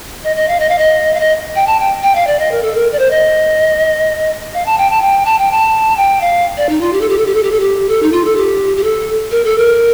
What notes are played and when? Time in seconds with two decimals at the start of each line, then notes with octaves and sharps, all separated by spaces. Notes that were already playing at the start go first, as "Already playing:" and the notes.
0.24 D#5
0.36 D#5
0.48 F5
0.60 D#5
0.69 F5
0.78 D#5
1.14 F5
1.20 D#5
1.56 G5
1.67 A5
1.80 G5
2.03 G5
2.15 F5
2.27 D5
2.39 D#5
2.52 A#4
2.63 A4
2.76 A#4
2.92 D5
2.99 C5
3.11 D#5
4.54 F5
4.66 A5
4.78 G5
4.90 A5
5.02 G5
5.26 A5
5.39 G5
5.51 A5
5.97 G5
6.21 F5
6.57 D5
6.69 D#4
6.81 F4
6.93 G4
7.01 A4
7.09 G4
7.18 A4
7.26 G4
7.35 A4
7.43 G4
7.52 A4
7.60 G4
7.89 A4
8.03 D#4
8.12 F4
8.25 A4
8.37 G4
8.77 G4
8.84 A4
9.31 A#4
9.45 A4
9.58 A#4